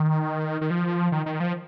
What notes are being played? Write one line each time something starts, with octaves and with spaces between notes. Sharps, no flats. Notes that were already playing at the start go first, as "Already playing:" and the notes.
Already playing: D#3
D#3
F3
D#3
D#3
F3